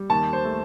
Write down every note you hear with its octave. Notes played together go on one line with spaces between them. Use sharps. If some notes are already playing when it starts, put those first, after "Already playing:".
Already playing: G3
D#2 A5
C5
A3